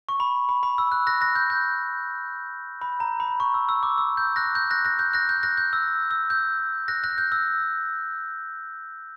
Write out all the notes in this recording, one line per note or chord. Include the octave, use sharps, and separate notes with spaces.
C#6
B5
B5
B5
E6
F#6
F#6 A#6
F#6 A#6
G6
G6
B5
A#5
B5
C#6
E6
E6
D6
E6
G6
F#6 A#6
G6
F#6 A#6
F#6 A#6
G6
F#6 A#6
G6
F#6 A#6
G6
E6
E6
G6
F#6 A#6
F#6 A#6
G6
E6